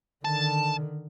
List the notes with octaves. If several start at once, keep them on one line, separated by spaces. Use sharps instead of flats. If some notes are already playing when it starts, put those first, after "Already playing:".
D3 D#3 A5